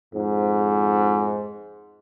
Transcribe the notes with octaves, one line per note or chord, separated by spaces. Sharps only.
F2 G#2